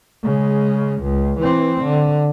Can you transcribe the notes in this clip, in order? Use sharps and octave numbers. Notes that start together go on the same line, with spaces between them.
C#3 G#3
C#2
E3 C4
D3